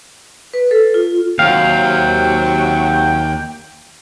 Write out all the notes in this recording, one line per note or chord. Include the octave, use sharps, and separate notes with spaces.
B4
A4
F4
D#2 C3 F#3 F5 G5